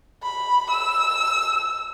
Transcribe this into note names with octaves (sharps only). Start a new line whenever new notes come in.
B5
E6